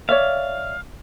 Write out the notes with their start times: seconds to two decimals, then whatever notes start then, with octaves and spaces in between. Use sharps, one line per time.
0.09 C#5 D5 E5 F5